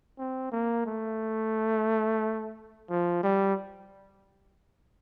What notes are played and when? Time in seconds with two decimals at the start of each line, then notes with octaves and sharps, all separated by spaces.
0.19 C4
0.52 A#3
0.86 A3
2.90 F3
3.23 G3